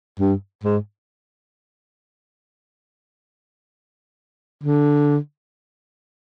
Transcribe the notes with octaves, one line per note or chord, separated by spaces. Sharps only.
G2
G#2
D3